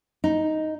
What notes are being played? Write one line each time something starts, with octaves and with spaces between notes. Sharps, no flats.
D#4